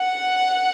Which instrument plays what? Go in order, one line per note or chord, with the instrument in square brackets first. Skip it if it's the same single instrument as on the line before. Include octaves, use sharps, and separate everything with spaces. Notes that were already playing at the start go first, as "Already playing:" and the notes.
Already playing: [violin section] F#5